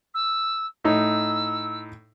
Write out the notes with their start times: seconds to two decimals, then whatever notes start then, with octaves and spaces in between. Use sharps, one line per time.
0.14 E6
0.85 A2 D#4 E6